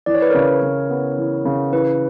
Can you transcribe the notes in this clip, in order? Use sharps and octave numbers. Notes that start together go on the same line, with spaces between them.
E3 D5
C#5
B4
C#3 A#4 C#5
C#3
B3
E3
C#3
E3 B4